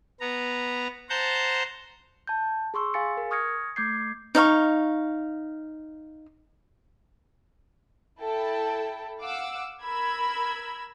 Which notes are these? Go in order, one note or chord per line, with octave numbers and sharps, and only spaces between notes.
B3 A#5
C5 F#5 A5 A#5 G6
A5 G6
G#4 C6 C#6 E6
G#4 F5 G#5 A6 C#7
A#4
C#6 D#6 F6 G#6 A#6 C#7
A3 D6 G6 G#6 C7
D#4 D5 F5 C#6
E4 A4 G5 A5
F5 F#5 D6 E6
A#4 B5 E6 G#6